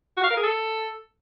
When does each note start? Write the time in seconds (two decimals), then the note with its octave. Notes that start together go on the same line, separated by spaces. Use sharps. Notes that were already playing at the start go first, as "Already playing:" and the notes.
0.17 F#4
0.24 F5
0.30 A#4
0.37 G#4
0.43 A4